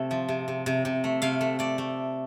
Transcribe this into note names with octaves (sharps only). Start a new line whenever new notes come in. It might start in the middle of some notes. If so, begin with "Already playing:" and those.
Already playing: C3 A3 C4
F3
C3
C3
C3
C3
A3
C3 F5
A3
A3 D5
A3